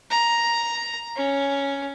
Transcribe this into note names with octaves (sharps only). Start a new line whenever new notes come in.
A#5
C#4